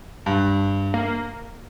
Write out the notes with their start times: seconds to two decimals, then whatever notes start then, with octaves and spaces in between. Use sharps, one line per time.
0.26 G2
0.94 A#3